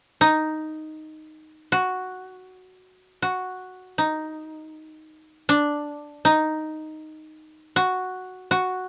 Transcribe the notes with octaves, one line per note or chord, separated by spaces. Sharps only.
D#4
F#4
F#4
D#4
D4
D#4
F#4
F#4